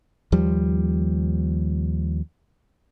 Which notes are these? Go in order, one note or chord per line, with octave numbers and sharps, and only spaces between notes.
D#2 F3 G3